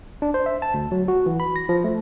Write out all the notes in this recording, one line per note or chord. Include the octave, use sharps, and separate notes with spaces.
D4
C5
E5
A5
D2
F#3
F#4
E3
B5
A#6
F3
A3